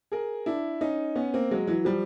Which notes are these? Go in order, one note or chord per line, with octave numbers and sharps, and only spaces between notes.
G#4 A#4
D4 E4
C#4 D#4
B3 C#4
A#3 C4
F#3 G#3
E3 F#3
F3 G3